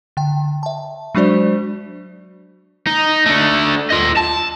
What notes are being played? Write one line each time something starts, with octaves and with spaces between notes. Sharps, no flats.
D3 G5
E5 A5
F#3 G#3 D4 F#4 C5 D5
D#4
A3 D4
F4 D#5
A5